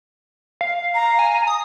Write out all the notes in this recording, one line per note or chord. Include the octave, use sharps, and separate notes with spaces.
F5
A#5
G#5
D#6